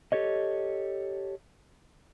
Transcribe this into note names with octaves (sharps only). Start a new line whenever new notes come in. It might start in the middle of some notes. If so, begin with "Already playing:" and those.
G4 A4 C#5 D#5